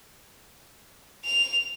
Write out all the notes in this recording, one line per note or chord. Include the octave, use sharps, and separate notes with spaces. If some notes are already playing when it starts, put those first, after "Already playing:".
F7